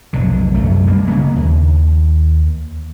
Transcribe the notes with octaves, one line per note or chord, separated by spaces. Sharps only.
F1 B1 D3
C2 F#2 A3
G3 A#3
C#3 A#3 B3
D#2